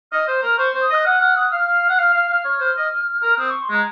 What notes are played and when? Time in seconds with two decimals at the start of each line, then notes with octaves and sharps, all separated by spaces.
0.12 D#5 F6
0.28 C5
0.42 A#4 F6
0.58 C5 C#6
0.74 C5
0.82 D#6
0.90 D#5 F#6
1.05 F#5 F6
1.21 F#5 F6
1.36 F#5 D#6
1.52 F5 F6
1.89 F#5
1.99 F5
2.14 F5
2.29 F5
2.45 C#5
2.60 C5
2.77 D#5
3.23 A#4
3.38 C4 D#6
3.50 C#6
3.62 C6
3.70 G#3 A#5